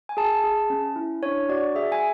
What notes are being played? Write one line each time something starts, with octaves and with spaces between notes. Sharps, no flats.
G#5
G#4 A5
G#4
C#4
E4
D4 C#5
F#4 D5
G#4 E5
G#5